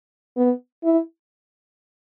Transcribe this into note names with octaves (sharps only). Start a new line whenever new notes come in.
B3
E4